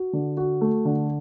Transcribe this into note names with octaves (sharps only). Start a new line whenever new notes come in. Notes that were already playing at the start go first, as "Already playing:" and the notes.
Already playing: F#4
D3
F#4
A3
D3